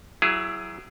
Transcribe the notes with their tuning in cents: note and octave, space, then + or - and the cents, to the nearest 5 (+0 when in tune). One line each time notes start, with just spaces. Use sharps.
F#3 +20 E4 +25 G#4 +0